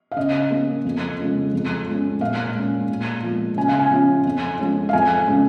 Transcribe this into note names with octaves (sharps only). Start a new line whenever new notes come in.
F5
C#3 D#5
A#3 C#4
F2
C#3 F3 G#3
F2
F3 G#3 C#4
A#2 F5
G#3 C#4
A#2
F3 G#3
C#3 G#5
F5
G#5
F3 C#4
F2
F3 G#3 C#4
F5
F2 G#5
C#3 G#3 C#4